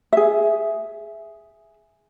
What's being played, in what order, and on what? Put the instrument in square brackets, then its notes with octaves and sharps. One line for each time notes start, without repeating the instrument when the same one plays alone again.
[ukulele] G#4 E5